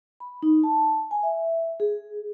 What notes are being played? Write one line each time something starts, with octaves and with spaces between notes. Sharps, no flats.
B5
D#4
A5
G#5
E5
G#4